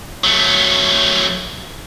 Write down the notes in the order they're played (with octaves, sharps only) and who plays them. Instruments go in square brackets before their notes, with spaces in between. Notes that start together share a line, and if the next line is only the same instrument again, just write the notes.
[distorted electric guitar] F#3 A3